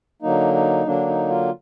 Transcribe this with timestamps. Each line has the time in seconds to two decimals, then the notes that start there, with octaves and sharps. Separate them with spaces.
0.22 D3 F#3 A#3 D#4
0.54 D#4
0.86 D3 F#3 A#3 D4
1.07 D#4
1.29 F4